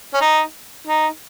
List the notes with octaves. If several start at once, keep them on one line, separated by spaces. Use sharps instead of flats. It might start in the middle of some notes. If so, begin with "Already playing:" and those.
C#4
D#4
D#4